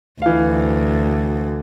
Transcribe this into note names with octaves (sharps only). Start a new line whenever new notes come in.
D2 E3 F5